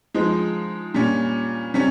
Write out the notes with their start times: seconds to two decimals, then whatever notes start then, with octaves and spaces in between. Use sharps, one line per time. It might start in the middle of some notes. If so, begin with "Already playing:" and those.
0.14 F3 G#3 D#4
0.94 A#2 G3 C#4
1.74 C3 G3 C#4